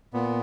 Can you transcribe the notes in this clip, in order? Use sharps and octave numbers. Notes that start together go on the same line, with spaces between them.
A#2 B3